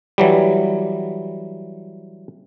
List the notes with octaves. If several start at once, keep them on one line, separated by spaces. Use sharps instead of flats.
E3 F#3 G3